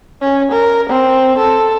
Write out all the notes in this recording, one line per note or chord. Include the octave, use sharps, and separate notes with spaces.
C#4
A#4
C4
A4